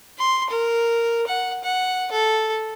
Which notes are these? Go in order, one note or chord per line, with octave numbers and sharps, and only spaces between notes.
C6
A#4
F#5
F#5
A4